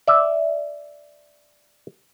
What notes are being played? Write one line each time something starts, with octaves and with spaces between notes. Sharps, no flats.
D5 E5